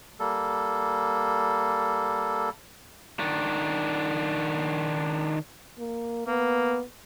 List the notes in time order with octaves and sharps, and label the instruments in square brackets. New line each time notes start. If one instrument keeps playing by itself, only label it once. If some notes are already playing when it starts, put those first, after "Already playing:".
[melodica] G3 A#3 A4
[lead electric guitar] D#3 D4
[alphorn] A#3
[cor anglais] A#3 [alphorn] B3